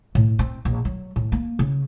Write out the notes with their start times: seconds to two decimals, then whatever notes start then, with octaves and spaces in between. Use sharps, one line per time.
0.15 A2
0.39 C4
0.65 A#1
0.85 F#3
1.16 A2
1.32 A#3
1.59 C#3